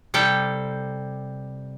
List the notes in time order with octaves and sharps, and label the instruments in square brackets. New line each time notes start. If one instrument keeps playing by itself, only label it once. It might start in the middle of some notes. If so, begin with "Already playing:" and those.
[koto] C3 G3 A4 G5